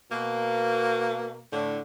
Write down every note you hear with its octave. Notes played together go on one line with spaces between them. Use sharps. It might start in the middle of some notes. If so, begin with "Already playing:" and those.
B2 A#3
A2 D3